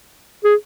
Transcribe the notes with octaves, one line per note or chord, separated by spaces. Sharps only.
G#4